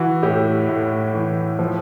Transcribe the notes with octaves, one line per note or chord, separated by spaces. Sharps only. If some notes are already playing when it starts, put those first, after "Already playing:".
Already playing: E3 F#4
A2 G4
A2
E3
F3